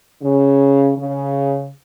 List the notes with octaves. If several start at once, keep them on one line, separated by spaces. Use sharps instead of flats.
C#3
C#3